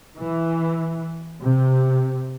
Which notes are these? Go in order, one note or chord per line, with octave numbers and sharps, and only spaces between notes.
E3
C3